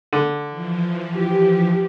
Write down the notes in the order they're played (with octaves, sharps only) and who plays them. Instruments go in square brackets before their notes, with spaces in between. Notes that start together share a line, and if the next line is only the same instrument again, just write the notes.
[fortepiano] D3
[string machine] E3 F3
[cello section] G4